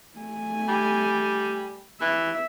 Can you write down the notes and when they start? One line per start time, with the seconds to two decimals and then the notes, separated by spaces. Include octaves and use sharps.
0.18 A3 G#5
0.68 G3
2.01 E3 E5